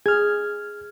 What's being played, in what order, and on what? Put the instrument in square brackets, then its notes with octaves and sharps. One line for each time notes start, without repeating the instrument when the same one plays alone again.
[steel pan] G#4 [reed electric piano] F6 G#6